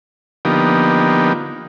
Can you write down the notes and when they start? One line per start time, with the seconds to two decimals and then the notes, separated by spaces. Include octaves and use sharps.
0.45 D3 F3 A#3 B3 D#4 G4